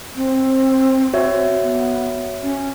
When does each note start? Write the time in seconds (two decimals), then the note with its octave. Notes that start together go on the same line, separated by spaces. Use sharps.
0.16 C4
1.14 F#4 C#5 E5
1.63 B3
2.42 C#4